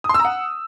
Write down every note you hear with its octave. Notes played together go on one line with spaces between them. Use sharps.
D#6
C6
E6
A#5
F#5